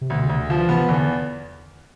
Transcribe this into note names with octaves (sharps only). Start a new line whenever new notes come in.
C3
D2 B2
C3
D2
D3
E3 F3
C3 B3
E3
E2 D3